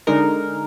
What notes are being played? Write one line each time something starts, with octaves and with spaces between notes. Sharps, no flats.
D3 G#3 D#4 A#4